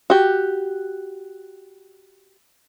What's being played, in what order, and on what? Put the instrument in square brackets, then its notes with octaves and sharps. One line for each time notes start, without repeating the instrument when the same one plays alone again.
[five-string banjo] F#4 G4